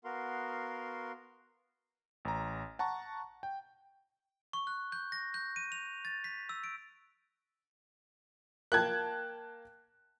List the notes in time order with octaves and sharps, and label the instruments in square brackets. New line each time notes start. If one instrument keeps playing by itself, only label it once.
[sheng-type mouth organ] B3 F#4 A#4 F5 C6
[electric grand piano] A1 A#5
F#5 A5 A#5 C#6
G5
[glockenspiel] C#6
F#6
G6
A#6
G6
D#7
F7
A6
B6
E6
D7
[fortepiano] A#3 G5 A5 [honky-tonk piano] F#6 G#6